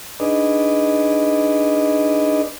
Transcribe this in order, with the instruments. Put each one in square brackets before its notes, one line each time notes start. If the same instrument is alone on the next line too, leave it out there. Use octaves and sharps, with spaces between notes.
[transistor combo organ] D4 D#4 G#4 B4 D5 D#5